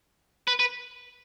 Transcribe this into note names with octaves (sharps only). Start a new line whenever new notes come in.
B4
B4